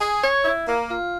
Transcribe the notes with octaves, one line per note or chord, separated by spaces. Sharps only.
G#4
C#5
E4
A#3
F4